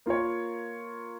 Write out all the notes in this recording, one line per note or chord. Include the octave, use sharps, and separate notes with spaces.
A#3 F4 A#4 C#5